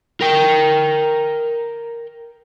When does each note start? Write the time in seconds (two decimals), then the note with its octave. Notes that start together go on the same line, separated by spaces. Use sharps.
0.21 A#4 G5